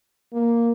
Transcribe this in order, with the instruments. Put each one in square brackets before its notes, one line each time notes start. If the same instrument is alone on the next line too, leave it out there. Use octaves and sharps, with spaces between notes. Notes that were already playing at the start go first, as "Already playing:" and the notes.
[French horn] A#3